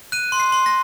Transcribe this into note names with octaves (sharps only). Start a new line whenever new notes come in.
F#6 D#7
C6
C7
C6
A#6